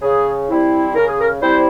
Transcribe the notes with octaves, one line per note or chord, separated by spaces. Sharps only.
C#3 G#4
G3 C4 E4
C#3 A#4
G#4
A#4
G3 C4 E4 C5